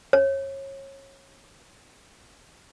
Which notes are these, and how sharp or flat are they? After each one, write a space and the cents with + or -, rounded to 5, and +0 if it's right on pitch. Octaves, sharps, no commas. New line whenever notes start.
C#5 -25